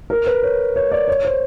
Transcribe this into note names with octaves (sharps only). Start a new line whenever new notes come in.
A#4
B4
C#5
C#5
D5
C#5
C5